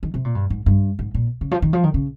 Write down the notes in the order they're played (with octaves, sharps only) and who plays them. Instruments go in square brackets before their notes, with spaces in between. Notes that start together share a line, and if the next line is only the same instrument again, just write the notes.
[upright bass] D#3
C3
A#2
G2
G#2
G2
G#2
A#2
C#3
F3
D#3
F3
D#3
C#3